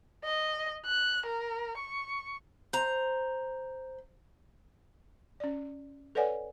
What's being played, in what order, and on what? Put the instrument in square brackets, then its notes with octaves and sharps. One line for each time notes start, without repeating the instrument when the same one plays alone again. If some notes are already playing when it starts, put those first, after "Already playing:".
[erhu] D#5
F#6
A#4
C#6
[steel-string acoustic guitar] C5 A#5
[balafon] C#4 D5
A4 B4 C#5 D5 F#5 G#5